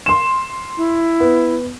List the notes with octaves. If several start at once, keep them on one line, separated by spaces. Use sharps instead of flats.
C6 E7
E4
B3